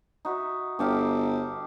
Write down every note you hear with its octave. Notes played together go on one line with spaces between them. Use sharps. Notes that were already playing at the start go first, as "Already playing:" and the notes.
D#4 F#4 E5
G1 G4 A4 F5